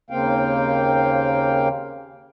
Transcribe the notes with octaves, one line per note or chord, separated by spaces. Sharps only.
D#2 C#3 A#3 C4 F5 G5